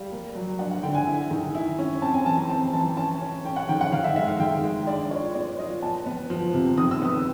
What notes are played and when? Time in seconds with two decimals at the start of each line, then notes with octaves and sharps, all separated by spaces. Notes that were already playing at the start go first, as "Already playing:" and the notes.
Already playing: G3 F5
0.12 A#3
0.35 F#3
0.59 D4 F#5
0.71 F#5
0.83 D3 G5
0.95 G#5
1.07 E4
1.31 D#3
1.55 E4
1.79 C#4
2.02 C4 A5
2.14 G#5
2.26 E3 A5
2.38 A#5
2.49 C4 A5
2.73 E3 A5
2.97 C#4 A5
3.21 C#4
3.45 C#4 G5
3.56 F#5
3.69 D#3 G5
3.81 F#5
3.92 D#3 F5
4.04 E5
4.16 G#3 E5
4.28 F5
4.40 D#3 G5
4.63 G#3
4.87 D4 D5
5.11 F4 C#5
5.35 B3 D5
5.59 F4 D#5
5.82 B3 A5
6.06 B3
6.30 F3
6.54 C3
6.78 D#3 D#6
6.91 E6
7.02 B3 D#6